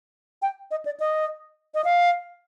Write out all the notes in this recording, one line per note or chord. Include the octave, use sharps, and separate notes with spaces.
G5
D#5
D5
D#5
D#5
F5